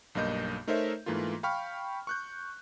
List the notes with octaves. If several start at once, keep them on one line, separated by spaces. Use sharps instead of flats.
B1 G2 A#3 D#5 G6
A3 D#4 A#4 C5 C#5 E5
G#2 E3 A3 A#3 F4
F5 G5 B5 C#6 F6
C#6 F#6 G6